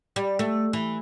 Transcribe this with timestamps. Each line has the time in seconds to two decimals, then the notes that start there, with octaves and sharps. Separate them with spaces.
0.16 G3
0.39 A3
0.73 E3